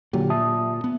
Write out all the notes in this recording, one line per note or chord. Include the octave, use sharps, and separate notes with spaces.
A#2 D3 F#3 G4
E5 A5 D#6
B3